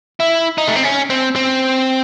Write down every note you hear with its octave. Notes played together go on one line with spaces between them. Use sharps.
E4
D#4
A3
C4
C#4
C4
C4